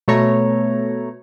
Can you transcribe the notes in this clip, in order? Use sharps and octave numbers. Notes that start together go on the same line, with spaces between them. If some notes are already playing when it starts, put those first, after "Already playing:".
B2 A3 C#5 A#5